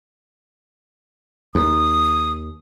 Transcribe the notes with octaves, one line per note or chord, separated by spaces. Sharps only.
D#2 D#6